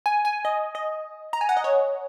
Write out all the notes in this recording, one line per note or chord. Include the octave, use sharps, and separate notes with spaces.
G#5
G#5
D#5
D#5
A#5
G#5
F#5
D#5
C#5